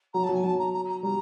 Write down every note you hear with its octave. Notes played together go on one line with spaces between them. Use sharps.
F#3 A#5
A5
F#3
G#5
F#3 A5
A#5
A#5
A#5
G3 A#5